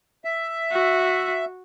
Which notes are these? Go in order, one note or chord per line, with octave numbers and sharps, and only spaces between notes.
E5
F#4